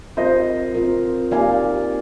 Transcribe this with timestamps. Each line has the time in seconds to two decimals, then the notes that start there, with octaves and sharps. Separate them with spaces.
0.17 C4 F4 A#4 C5 D#5
0.75 C4 F4 A#4
1.32 A#3 D#4 G4 A#4 D5 F5 G#5